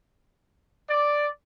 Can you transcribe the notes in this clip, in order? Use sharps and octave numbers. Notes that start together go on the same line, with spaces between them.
D5